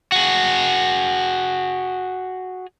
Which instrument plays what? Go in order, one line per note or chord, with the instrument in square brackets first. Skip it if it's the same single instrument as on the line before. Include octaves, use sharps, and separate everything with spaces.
[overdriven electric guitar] F#4 G#4